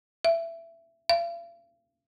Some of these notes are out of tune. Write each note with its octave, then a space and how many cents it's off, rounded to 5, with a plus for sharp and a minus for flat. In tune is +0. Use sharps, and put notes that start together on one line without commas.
E5 +15
F5 -45